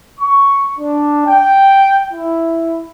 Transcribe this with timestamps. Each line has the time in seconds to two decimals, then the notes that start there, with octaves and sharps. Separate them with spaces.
0.20 C#6
0.79 D4
1.25 G5
2.12 E4